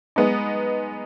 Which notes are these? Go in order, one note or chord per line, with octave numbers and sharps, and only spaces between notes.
G#3 B3 D#4